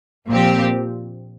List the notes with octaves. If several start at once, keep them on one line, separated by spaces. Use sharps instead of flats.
A#1 A#2 F3 C4 G4